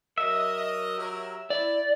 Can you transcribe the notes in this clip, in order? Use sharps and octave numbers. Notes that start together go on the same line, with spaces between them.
F#3 A#4 D#5 E5
F#3 G4 A#4
E4 D5